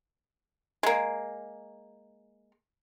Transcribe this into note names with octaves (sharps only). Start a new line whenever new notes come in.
G#3 A#3